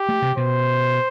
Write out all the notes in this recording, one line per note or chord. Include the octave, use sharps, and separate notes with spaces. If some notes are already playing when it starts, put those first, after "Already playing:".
Already playing: G4
A3
C3
B2 C5